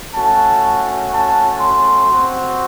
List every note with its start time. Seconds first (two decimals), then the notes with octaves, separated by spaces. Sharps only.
0.15 A3 C#4 F#4 A5
1.13 A5
1.61 C6
2.09 C4 F#4